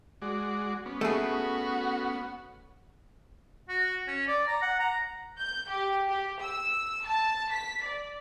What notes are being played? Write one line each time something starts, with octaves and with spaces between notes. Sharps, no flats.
G#3 F#4 D5
B3 C#4
A3 F#4 G#4
F#4
C#4
D5
A#5
F#5
A#5
G6
G4
G4
E6
A5
B6
D5